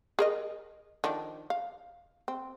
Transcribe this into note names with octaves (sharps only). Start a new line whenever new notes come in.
G#4 A#4 D#5
D#3 F3 D4
F5
C4